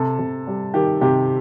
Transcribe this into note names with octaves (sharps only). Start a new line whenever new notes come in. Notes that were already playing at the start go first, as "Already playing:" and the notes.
Already playing: C3 A4
C3
G3
D#3 G4
C3 G4